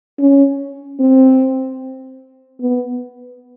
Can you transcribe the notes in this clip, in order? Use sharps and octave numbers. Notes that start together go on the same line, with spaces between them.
C#4
C4
B3